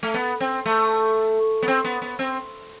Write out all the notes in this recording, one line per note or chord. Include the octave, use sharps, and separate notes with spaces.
A3
B3
C4
A3
B3
C4
B3
B3
C4